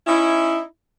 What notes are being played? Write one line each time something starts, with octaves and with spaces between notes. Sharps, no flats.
C#4 D#4 E4